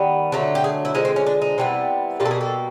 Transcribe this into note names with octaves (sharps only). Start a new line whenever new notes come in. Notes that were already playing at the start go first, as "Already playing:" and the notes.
Already playing: D#3 G3 B3
D3 F#3 A3
G4
G#4
E4
D3 F3 G#3 D#4
C4
C#4
D4
D#4
C3 E3 G3 B3
B2 G3 A#3 F4
A4
G#4
A4